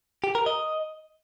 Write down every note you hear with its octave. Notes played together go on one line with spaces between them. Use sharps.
G4
A#4
D#5